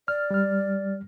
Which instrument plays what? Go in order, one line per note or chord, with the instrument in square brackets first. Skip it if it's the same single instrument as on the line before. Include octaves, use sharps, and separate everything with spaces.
[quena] D5 [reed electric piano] F6
[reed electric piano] G3 F6